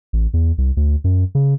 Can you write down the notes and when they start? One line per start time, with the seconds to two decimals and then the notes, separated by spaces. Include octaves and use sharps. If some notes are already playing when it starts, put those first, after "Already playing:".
0.13 A1
0.34 E2
0.58 C2
0.77 D2
1.04 F#2
1.35 C#3